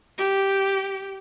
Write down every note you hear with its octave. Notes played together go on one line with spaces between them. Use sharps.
G4